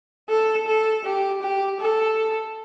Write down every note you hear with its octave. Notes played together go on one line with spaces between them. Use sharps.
A4
A4
G4
G4
A4